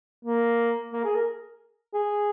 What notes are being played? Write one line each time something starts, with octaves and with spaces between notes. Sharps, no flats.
A#3
A#3
G#4
A#4
G#4